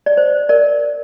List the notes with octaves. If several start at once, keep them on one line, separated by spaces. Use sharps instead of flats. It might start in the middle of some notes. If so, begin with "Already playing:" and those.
D5
C5
A#4 D5